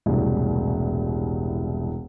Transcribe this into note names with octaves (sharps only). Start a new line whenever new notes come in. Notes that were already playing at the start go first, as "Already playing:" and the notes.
E1 C2 A2